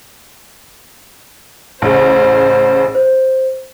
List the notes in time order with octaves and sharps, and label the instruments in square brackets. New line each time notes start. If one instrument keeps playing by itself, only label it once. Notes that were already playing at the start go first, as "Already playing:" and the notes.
[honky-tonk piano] A1 C#3 [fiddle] C5
[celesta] C5